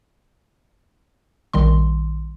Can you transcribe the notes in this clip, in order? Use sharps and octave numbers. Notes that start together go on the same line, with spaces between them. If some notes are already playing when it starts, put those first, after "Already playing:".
A#1 D#3 G3 C6